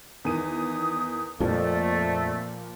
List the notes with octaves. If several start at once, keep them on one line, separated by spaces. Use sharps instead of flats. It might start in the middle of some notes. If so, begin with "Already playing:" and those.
E2 D#3 D#6 D#7
F2 A#2 F3 A3 D5